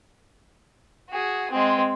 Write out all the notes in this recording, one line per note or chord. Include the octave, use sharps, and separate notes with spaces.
F#4 G#4
G#3 C4